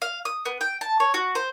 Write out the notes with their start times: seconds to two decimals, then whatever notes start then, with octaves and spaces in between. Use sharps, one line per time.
0.02 F5
0.25 D#6
0.45 B3
0.61 G5
0.81 A5
1.00 C#5
1.14 F#4
1.35 C5